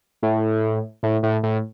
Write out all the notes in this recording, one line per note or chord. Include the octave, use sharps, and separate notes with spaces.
A2
A2
A2
A2